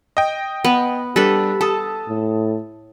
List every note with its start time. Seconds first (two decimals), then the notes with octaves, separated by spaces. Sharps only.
0.17 D#5 G5
0.65 B3
1.16 G3 D4 G4 A4 B4
1.61 A4 A5 D#6
2.09 A2